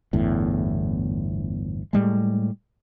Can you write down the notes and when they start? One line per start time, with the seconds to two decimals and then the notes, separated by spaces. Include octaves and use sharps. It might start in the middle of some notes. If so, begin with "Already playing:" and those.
0.13 G1 E2 A2
1.93 A2 G3 G#3